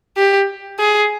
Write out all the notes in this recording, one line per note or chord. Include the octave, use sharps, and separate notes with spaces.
G4
G#4